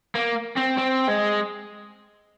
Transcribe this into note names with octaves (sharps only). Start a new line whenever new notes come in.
A#3
C4
C4
G#3